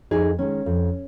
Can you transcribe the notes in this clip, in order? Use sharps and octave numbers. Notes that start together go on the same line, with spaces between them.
F2 D#4 G#4
D#3 G#3 C#4
F2